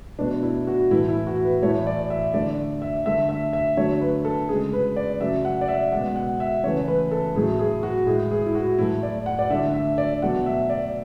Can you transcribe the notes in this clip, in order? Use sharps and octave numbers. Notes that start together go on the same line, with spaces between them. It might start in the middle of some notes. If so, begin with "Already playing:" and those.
B2 A3 D4
E4
F#4
A2 E3 A3 E4
E4
F#4
B4
A2 E3 A3 C#5
D5
E5
D3 A3 D5
E5
D3 A3 E5
E5
E5
D3 F#3 A3 C#5
B4
A4
C#3 G#3 G#4
B4
D5
C#3 F#3 A3 E5
F#5
D5
E5
B2 G#3 F#5
F#5
E5
C#3 E3 A3 C#5
B4
A4
A2 F#3 A3 G#4
G#4
F#4
A2 G#3 G#4
G#4
E4
F#4
A2 F#3 A3 E4
D5
F#5
D5
D3 A3 E5
E5
D5
B2 F#3 A3 F#5
E5
D5